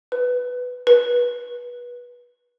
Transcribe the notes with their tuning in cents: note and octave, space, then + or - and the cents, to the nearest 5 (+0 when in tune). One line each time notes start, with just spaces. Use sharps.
B4 +5
B4 -25